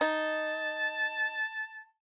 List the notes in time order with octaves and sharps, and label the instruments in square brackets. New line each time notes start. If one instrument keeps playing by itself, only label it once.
[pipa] D#4 [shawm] A5